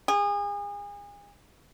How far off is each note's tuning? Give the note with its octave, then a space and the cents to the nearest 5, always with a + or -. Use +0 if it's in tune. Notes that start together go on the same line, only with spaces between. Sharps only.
G#4 -35